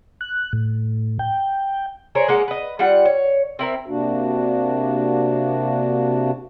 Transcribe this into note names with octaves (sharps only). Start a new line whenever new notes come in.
F#6
A2
G5
G#4 A#4 C5 C#5
G#3 A#3 F#5
B4 D#5
G3 F4 F#5
C#5
C4 E4 A#4
C3 A#3 D4 F#4